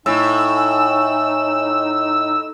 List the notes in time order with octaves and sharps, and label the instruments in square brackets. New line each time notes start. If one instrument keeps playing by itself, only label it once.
[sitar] A2 [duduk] D#4 [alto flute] G#5 [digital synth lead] E6